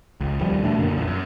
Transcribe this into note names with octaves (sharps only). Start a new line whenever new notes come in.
C#2
D#2 F3 G3
B2 A3 D4
F#1 F#2 D3 A#3
A#1 E2 A#2
F#2